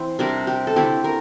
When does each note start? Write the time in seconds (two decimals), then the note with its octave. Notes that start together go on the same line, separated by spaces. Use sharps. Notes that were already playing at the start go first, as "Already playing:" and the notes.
Already playing: E3 C4 E4 C5
0.19 C3 G3 D4 A#4
0.47 G4
0.67 A4
0.76 D3 A3 C4 E4 G4
1.04 A#4